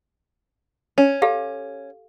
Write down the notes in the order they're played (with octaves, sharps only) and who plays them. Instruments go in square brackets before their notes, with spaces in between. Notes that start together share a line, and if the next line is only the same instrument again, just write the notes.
[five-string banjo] C#4
[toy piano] G4 A4 F5